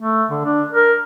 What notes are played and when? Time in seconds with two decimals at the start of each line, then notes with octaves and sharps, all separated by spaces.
0.01 A3
0.30 D3
0.45 D4
0.73 A#4